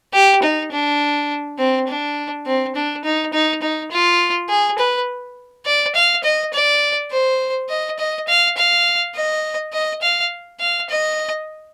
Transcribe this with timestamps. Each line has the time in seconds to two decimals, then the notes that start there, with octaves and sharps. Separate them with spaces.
0.13 G4
0.42 D#4
0.72 D4
1.59 C4
1.88 D4
2.46 C4
2.75 D4
3.04 D#4
3.33 D#4
3.62 D#4
3.91 F4
4.50 G#4
4.79 B4
5.66 D5
5.95 F5
6.24 D#5
6.53 D5
7.11 C5
7.69 D#5
7.99 D#5
8.28 F5
8.57 F5
9.15 D#5
9.73 D#5
10.02 F5
10.60 F5
10.90 D#5